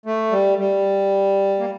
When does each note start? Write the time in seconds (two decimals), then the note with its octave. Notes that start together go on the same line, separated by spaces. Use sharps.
0.06 A3
0.31 G3
0.58 G3
1.59 A#3